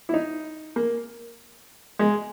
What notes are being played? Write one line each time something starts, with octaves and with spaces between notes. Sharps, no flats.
E4
D#4
A#3
G#3